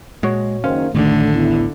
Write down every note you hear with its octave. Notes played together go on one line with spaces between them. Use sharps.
A#2 G#3 F#4 C#5
F#1 D#3 C#4 C5 F5
A1 D2 A2 D3 D#3 A3
B3 E4